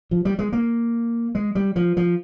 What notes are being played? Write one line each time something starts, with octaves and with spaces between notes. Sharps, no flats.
F3
G3
G#3
A#3
G#3
G3
F3
F3